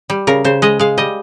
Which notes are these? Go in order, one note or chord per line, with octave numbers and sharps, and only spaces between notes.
G3
C#3 A#4
C#3 C5
G#3 D#5
G#3 F5
G3 D#5